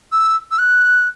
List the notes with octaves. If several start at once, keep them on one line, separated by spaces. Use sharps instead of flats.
E6
E6
F#6